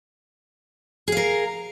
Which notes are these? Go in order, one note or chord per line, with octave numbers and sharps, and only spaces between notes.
G#4 A#4 F5